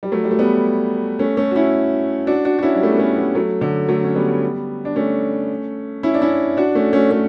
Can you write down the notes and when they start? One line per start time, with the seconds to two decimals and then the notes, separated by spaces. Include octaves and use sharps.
0.03 G3
0.12 F#3 A3
0.24 G3
0.31 A3
0.39 G3 B3
1.19 A3 C#4
1.37 A3 C#4
1.51 F#4
1.56 C#4 E4
2.27 D4 F#4
2.45 D4 F#4
2.59 F#4
2.63 C#4 E4
2.75 G3
2.83 A3
2.91 B3
2.98 A3 C#4
3.16 G3 B3
3.35 F#3 A3
3.61 D3 F#3
3.89 F#3 A3
4.04 C#4
4.15 G3 B3
4.85 D4
4.96 A3 C#4
6.03 C#4 E4
6.14 D4
6.22 C#4 E4
6.57 D4 F#4
6.75 A3 C#4
6.93 A3 C#4
7.11 A3 C#4